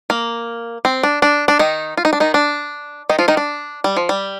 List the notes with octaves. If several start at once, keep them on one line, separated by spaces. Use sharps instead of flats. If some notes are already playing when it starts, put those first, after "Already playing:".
A#3
C4
D4
D4
D4
D#3 D#4
F4
D#4
D4
D#3 D#4
D4
D#3 D#4
F3 F4
D#3 D#4
D4
G3
F3
G3